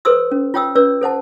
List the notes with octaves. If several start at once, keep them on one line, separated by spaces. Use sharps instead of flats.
A4 B4 C5 C6 D#6 E6
C#4
F4 C#5 G5 D#6 E6
C#4 B4 C#5 D5 E6
A4 C5 F#5 A5